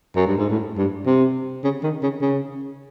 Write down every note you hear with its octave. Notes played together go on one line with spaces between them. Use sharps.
F#2
G2
G#2
A2
G2
C3
C#3
D#3
C#3
C#3